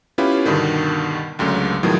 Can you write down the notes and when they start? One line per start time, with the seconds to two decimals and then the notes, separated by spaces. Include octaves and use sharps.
0.18 B3 C#4 E4 F4 G4 B4
0.45 G2 B2 D3 D#3
1.39 C#2 F#2 D3 A3
1.83 A2 D#3 F3 F#3 G#3 B3